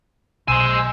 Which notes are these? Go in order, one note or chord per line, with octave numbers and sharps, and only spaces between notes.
B1 C5 G#5 C6 E6